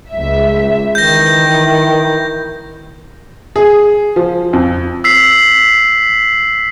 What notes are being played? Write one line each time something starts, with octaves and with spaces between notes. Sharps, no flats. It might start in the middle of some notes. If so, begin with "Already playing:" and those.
C#2 E5
D#3 E3 G6 A#6
G#4
F3
F2
E6 B6 C7